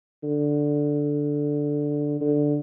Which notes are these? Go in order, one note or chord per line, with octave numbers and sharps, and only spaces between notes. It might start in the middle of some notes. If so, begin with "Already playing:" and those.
D3
D3